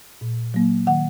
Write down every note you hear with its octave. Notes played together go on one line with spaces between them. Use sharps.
A#2
F#3 A#3
D#3 F#5